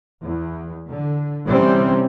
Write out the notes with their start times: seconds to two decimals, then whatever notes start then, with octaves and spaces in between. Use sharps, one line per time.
0.22 E2
0.89 D3
1.46 C3 E3 G3 C4 C#4